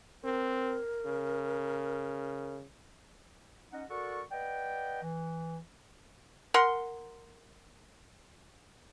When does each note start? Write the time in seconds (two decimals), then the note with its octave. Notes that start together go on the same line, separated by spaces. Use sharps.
0.23 C4 A#4
1.05 C#3
3.72 C#4 D#4 D#5 F#5
3.90 F#4 A4 A#4 D5 F#5 C#6
4.32 B4 D5 D#5 F#5 G5
5.03 E3
6.54 A#4 F#5 C6